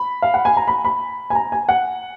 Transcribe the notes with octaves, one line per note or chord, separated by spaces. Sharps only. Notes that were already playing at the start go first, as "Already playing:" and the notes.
Already playing: B5
F5
F#5
G#5
A#5
B5
B5
G#5
A#5
G#5
F#5